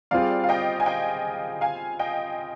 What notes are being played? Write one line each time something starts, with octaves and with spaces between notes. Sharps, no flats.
G3 C4 F4 G#4 D5 F5
F5
D#5 G5
G#5
D#5 G5
F5 G#5
D#5 G5